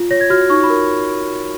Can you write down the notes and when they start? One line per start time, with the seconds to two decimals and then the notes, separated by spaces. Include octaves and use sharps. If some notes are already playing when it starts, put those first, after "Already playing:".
Already playing: F4
0.11 C#5 A#6
0.21 G#6
0.30 F#4 F6
0.50 D#4 C#6
0.63 B5
0.70 A#4